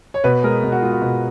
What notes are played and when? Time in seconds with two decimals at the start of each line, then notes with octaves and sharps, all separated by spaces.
0.14 C#5
0.24 B2 B4
0.43 G#3 A#4
0.63 B2
0.72 F#4
0.82 G#3 F4
0.91 F#4
1.02 B2